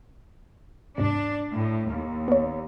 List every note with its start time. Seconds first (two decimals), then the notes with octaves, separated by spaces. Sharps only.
0.98 E2 G#2 C3 D4
1.53 A2
1.90 D#2
2.28 B3 C#5